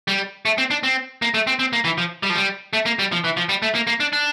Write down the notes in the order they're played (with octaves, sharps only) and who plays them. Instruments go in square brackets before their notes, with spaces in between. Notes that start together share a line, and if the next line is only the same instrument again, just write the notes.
[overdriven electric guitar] G3
A3
C4
D4
C4
A#3
A3
C4
C4
A#3
E3
F3
G3
F3
G3
A3
A#3
G3
F3
E3
F3
G3
A3
A#3
A#3
D4
D4